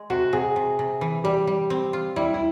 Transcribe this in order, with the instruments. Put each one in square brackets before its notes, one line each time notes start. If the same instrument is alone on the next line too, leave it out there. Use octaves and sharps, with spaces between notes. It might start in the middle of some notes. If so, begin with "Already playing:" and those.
Already playing: [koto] G#3
[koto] C3 [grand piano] F#4
[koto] C3 [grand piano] G#4
[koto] C3
C3
E3
[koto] G3 [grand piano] G4
[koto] G3
C4
F4
[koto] G3 [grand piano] E4
[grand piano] E4